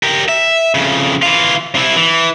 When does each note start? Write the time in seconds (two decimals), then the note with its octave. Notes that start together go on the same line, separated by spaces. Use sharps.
0.03 G4 A#4
0.29 E5
0.75 F2 C#3
1.22 E3 F4
1.75 C3 E4
1.96 E3